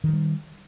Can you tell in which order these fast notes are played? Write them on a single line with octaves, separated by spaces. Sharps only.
D#3 F3 G3